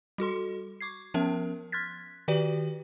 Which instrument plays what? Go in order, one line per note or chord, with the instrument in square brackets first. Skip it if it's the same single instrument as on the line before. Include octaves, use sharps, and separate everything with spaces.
[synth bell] G3 F#4 A4 C6
C#6 D6 G#6 C7
F3 B3 C#4 A#4 E5
C6 F6 F#6 G#6 A6 B6
D#3 F#4 G4 B4 D5